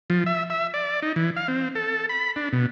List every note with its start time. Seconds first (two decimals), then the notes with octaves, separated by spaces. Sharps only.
0.10 F3
0.26 E5
0.50 E5
0.74 D5
1.02 D#4
1.16 E3
1.36 F5
1.48 C4
1.75 A4
2.09 B5
2.36 D4
2.53 B2